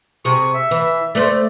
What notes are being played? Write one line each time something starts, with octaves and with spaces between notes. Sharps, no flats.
C3 G#4 C#6
E5
E3
A3 B4 C5 D5